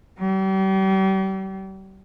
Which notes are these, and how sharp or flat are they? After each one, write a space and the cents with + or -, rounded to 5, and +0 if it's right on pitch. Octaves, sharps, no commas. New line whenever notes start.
G3 -35